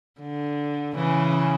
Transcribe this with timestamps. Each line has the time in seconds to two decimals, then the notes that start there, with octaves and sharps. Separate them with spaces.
0.20 D3
0.95 C#3 E3